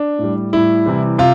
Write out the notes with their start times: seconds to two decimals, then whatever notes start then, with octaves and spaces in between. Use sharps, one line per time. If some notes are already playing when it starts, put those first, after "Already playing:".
Already playing: D4
0.19 A2 G3
0.53 A2 G3 E4
0.86 C3 E3 G3
1.18 C3 F4